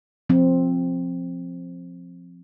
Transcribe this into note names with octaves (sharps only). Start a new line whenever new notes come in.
F3 C4